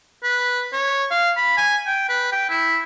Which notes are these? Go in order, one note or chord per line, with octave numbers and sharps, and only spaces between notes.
B4
C#5
F5
B5
G#5
G5
B4
G5
E4